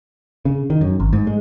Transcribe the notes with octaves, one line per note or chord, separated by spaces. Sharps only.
C#3
D#3
F#2
G#1
G#2
G#3